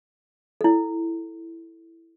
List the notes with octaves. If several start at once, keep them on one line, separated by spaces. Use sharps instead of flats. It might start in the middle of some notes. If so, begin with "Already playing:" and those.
E4 A4